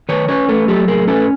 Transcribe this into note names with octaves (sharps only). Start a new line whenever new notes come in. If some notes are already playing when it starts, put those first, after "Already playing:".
D#3 B4 C#5
C#4 B4 C#5
A3 A4 B4
F#3 G4 A4
A2 G#4 A#4
C#4 A4 B4